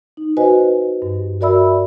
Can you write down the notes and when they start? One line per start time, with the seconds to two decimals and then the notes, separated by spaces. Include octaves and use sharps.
0.17 D#4
0.37 F#4 B4 C5 D#5 G#5
1.02 G2
1.41 F#4 A#4 D5 E5 B5 E6